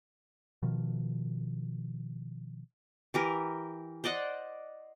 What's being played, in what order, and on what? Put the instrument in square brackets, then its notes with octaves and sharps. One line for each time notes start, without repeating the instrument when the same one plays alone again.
[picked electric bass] B2 D#3 F3
[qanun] E3 G4 A#4
C5 D5 D#5 F#5